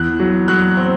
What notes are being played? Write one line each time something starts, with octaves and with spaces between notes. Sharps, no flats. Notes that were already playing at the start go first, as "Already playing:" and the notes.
Already playing: E2 F#6
F#3
F#3 F#6
C4